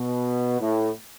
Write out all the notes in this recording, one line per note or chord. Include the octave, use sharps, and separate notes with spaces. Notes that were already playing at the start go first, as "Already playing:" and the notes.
Already playing: B2
A2